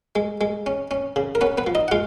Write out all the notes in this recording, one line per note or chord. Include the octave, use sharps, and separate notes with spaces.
G#3
G#3
C#4
C#4
C#3
A#4
B3 C#4 B4
B3 B4
F3
D#4 D#5
F#5
G#3 F4 F5